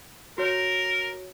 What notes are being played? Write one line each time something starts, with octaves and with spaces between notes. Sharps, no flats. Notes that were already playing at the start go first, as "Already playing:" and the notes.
F#4 A#4 C#5